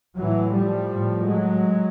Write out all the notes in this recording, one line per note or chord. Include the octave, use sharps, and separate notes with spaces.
A2 E3 F#3
F3 G3
A2
F#3 G#3